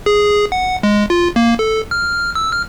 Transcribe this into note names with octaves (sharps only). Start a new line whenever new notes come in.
G#4
F#5
G#3
F4
A#3
A4
F6
E6
F6